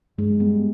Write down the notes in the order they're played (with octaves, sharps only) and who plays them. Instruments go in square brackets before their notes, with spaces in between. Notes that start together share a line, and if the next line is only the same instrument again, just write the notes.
[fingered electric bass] G2 [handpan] G#3
[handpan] G3 [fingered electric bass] B3